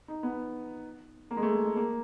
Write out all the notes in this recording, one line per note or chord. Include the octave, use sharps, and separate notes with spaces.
D#4
B3
A#3
G#3
A3
G#3
G#3
A#3